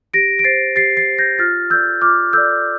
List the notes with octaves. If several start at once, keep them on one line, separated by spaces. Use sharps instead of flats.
G4 A#6 D7
D7
C5 A6 C7
G4 A6 C7
A6 C7
C5
G6 A#6
F4 F6 A6
A4 D5 E6 G6
F4 D6 F6
A4 D5 E6 G6